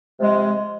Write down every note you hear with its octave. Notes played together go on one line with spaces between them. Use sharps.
C3 F3 G#3